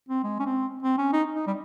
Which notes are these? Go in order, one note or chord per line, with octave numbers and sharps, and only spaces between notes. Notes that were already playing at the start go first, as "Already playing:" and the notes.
C4
G#3
C#4
C4
C4
C#4
D#4
D#4
G3